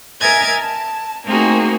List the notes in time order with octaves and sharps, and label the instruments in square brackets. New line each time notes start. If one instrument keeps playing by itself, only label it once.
[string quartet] A#4 D#5 E5 G#5 G#6 A6
A5
A3 A#3 C4 D#4 F#4 G#4